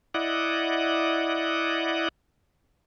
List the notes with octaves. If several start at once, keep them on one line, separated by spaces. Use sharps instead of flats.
E4 D5 D#5 F#5